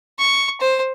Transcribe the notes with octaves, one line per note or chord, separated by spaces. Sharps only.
C#6
C5